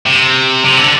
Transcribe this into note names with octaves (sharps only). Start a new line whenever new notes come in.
C3
C3
D3